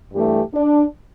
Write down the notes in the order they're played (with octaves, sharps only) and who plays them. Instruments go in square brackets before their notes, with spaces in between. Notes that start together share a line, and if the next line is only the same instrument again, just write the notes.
[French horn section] G2 E3 A3 G4
D4